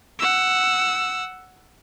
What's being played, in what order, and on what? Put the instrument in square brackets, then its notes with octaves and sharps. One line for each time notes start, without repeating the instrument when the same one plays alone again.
[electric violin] F#5 E6